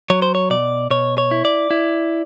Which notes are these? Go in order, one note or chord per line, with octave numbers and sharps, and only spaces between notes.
F#3 C#5
C5
C#5
B2 D5
B2 C#5
C#5
E4
D5
E4